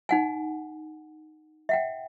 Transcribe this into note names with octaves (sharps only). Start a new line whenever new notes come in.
D#4 F#5 G#5
E5 F#5 G5